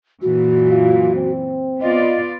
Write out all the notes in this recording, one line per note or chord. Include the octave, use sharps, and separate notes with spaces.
F#2 A#2 E3 F#4
F4
C4
B3 F4 D5 D#5